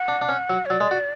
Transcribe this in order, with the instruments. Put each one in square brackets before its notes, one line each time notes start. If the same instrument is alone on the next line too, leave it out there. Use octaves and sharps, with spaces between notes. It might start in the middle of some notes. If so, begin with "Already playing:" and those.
Already playing: [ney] F#5
[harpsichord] D4
D4
C#4
F#3
[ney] C#5
[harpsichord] F#3 [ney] D5
[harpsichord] G#3
F#4